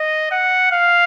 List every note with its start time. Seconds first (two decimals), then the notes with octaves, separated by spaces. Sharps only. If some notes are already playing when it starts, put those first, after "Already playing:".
Already playing: D#5
0.31 F#5
0.72 F5